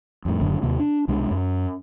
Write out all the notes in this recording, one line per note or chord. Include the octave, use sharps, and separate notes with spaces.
F2 A2
F#1 F#2 A2 D3
D#2 C3 A#3
D4
C2 B2 G#3 D4
F#2